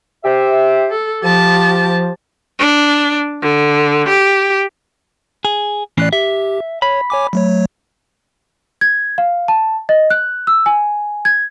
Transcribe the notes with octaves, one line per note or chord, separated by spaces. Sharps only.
G4 C5 E5
A4
F3 G4 A5
D4
D3
G4
G#4
A2 E3 C#4 D5 F#6 C7
G4 E5
C#5 B5
C#5 G#5 D6
F#3 A3 C#5
G#6
F5
A5
D#5
F#6
E6
G#5
G#6